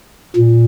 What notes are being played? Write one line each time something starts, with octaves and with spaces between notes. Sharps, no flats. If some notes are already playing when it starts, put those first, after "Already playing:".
A#2